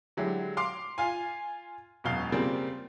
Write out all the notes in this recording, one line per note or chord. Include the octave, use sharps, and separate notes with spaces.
D3 F#3 G#3 E4 G4
F5 C6 D6
F4 F5 G#5
E1 F#2 B2 F5 G7
C#3 G3 A#3 C4 F4 A#4